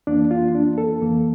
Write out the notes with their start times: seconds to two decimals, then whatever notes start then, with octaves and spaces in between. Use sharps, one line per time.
0.07 F2 E3 A#3 D4
0.31 F4
0.55 D4
0.78 A4
1.02 F2 E3 A#3